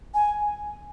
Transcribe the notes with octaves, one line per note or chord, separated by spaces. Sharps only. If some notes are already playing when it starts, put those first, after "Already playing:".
G#5